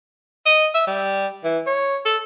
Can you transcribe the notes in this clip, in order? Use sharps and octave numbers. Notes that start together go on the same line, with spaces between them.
D#5
E5
G3
E3
C#5
A4